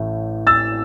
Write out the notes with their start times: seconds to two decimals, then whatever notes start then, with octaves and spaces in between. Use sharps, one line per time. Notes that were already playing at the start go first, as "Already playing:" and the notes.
Already playing: A1 A2 A3
0.47 E6 A6